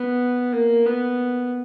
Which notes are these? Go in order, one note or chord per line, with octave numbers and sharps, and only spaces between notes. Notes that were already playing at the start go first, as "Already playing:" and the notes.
Already playing: B3
A#3
B3